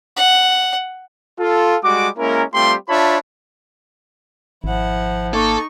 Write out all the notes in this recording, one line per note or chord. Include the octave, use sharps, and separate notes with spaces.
F#5
F4 A4
G3 G#3 F#4 D6
G#3 A#3 C#4 E4 A#4
G3 A3 C4 F4 G4 C6
D4 F4 C#5 E5 A5 B5
G#1 F3 E4 F#5
A#3 D#4 A4 C#6